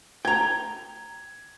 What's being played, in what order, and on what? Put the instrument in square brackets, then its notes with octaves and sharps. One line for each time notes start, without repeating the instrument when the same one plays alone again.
[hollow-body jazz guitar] G5 A#5 [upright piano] G#6